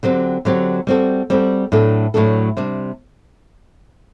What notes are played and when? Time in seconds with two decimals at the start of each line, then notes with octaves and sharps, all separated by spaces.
0.03 D3 F#3 C4 G4
0.45 D3 F#3 C4 G4
0.87 G3 C4 F#4 A4
1.30 G3 C4 F#4 A4
1.72 A2 F#3 A3 D4 A4
2.14 A2 F#3 A3 D4 A4
2.57 C3 G3 D4